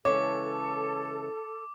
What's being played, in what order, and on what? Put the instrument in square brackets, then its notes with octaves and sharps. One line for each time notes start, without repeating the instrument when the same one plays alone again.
[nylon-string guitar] C#3 E3 G#3 [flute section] A4 [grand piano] C#5 [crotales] D6